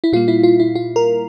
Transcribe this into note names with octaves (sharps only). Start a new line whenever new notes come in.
E4
A#2 G3 A#3 F4
E4
F4
E4
F4
A#4